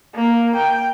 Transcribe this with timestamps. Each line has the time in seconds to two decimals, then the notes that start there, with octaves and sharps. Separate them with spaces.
0.16 A#3
0.56 G5